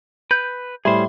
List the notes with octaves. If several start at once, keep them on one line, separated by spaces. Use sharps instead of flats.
B4 G6
A2 G3 G#4 C5 E5 B5 C6